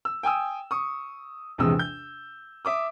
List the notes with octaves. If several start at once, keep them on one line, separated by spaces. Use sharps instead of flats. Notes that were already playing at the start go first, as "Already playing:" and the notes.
E6
G5 G#5 D#6 E6
C#6 D#6
A#1 E2 C3 G#3 D#6 E6
G6
E5 D6 D#6